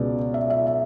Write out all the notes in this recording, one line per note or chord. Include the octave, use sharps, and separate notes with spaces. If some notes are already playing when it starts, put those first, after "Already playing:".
Already playing: C#2 B2 D5
E5
E5
E5